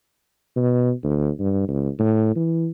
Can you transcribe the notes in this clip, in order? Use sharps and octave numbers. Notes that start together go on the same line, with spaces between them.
B2
D2
G2
C#2
A2
E3